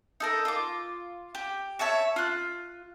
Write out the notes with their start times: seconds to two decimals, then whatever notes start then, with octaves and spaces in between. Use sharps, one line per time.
0.20 D#4 A4 A#4
0.45 F4 D6
1.35 G4
1.79 C#5 E5 A5 C#6
2.16 F4 F#6